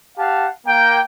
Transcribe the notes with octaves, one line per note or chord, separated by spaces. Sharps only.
G4 F5 F#5 A5
A#3 G5